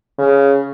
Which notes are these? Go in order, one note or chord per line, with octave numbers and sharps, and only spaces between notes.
C#3